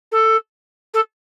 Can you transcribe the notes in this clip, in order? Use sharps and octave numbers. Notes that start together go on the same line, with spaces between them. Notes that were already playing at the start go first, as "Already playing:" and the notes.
A4
A4